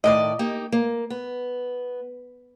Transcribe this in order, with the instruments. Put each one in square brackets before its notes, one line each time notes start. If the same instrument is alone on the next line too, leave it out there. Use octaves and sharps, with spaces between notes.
[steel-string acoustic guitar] A2 D#3 D5 [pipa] D#5
[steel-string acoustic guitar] A#3 D#4 G4
A#3
B3